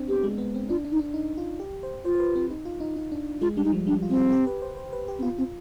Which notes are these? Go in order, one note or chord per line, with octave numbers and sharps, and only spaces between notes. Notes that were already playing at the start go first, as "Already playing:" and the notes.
Already playing: C4 D4
B3 G4
G#3
B3
C4
D4 F4
D4
D#4
D4
D#4
F4
G4
C5
F4 C5
C5
B4
C4
D#4
F4
D#4
D#4
D4
G#3 F4
G3 D4
D#4
F3
G3 D4
F4
C4
G4
G4
B4
C5
C5
B4
G4
C4
B3 F4
C4 F4